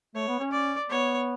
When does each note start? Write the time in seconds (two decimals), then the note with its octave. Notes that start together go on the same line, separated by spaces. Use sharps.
0.15 A3 C#5
0.28 B3
0.40 C#4
0.52 D5
0.90 B3 C#5